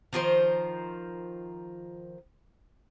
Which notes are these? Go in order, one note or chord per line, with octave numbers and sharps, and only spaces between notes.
D#3 F3 A#4 C5